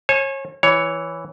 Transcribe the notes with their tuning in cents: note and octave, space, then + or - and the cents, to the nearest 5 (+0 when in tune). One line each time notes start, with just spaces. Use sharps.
C#5 -30 G#5 +30
E3 +0 C#5 +10